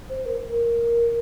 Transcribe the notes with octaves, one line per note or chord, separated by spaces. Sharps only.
C5
A#4
A#4